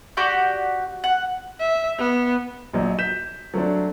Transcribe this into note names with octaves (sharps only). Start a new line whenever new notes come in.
F#4 G4 D5 F#5
F#5
E5
B3
A#1 F#3 D#5
G6 B6 E7
F#3 A3 C4 D4